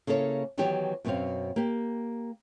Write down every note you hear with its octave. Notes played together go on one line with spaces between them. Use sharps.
C#3 A#3 E4 A4 C#5
D#3 E3 F#3 B3 G4 C#5
F#2 B2 B3 C4 C#5 F5
A#3 G4